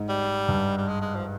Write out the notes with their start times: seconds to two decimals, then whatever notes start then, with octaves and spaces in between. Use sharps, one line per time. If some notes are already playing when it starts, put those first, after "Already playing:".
Already playing: G#2
0.09 G3
0.48 G2
0.78 G3
0.88 G#3
1.02 G#3
1.15 F3